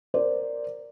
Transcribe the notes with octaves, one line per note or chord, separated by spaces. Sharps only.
A#4 C5 D5